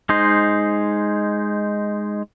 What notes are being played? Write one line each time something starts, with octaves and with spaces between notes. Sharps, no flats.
G#3 D#4 C5